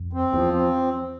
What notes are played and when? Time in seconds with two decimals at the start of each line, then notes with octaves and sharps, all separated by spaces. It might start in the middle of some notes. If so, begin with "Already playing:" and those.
Already playing: F2
0.13 C4
0.32 E2 F3
0.53 C4